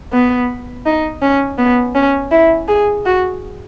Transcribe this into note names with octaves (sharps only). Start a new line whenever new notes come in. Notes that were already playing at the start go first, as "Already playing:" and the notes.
B3
D#4
C#4
B3
C#4
E4
G#4
F#4